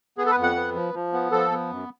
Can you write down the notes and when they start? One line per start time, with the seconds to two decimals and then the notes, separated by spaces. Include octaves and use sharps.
0.18 B3 G#4
0.26 A4
0.31 B4
0.37 F2
0.43 F#5
0.56 B3
0.75 F3
0.94 F3
1.13 B3
1.32 F3 A4
1.51 B3
1.70 F#2